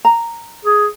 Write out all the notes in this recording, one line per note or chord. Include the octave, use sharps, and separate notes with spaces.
A#5
G#4